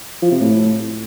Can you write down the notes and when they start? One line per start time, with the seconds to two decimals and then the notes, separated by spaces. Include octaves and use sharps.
0.22 F3
0.32 C3
0.41 A2